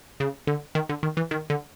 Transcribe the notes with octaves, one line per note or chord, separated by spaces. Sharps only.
C#3
D3
D#3
D3
D#3
E3
D#3
D3